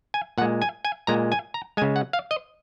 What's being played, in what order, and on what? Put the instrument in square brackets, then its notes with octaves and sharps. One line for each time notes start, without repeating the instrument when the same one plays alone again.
[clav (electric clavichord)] G#5
A#2 F#5
G#3
G#5
G#5
A#2 G#3 A#5
G#5
A#5
G#3 G#5
C#3
F#5
F5
D#5